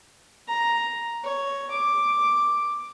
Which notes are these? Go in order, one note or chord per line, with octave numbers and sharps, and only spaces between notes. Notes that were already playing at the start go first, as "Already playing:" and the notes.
A#5
C#5
D6